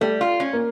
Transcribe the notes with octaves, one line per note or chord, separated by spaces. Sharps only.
G3 A3 A4
F4
C#4
A#3 A#4